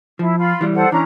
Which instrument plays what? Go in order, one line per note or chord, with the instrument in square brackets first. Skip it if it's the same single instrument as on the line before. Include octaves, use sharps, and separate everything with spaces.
[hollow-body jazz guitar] F3 [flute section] E4
[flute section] F4 B5
[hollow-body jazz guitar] E3 G3
[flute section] A4 C5 F#5
[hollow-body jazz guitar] E3 [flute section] C#4 D4 A#5